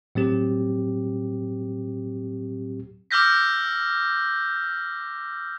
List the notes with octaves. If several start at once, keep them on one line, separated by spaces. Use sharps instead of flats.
A2 F#3 C4 G4
D6 E6 F6 G6 A#6 B6